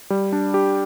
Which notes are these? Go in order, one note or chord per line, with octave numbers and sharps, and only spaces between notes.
G3
D4
G4